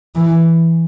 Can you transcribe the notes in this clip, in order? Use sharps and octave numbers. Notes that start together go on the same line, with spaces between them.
E3